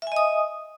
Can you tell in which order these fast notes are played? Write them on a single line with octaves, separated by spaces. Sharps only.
E5 G#5 D#5 D#6